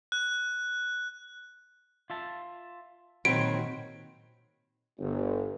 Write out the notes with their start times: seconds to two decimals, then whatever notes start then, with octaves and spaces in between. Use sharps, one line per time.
0.12 F#6
2.10 F4 E5 A5
3.25 A#2 D#3 F#3 C4 D#4 B5 C6 D7
4.99 G1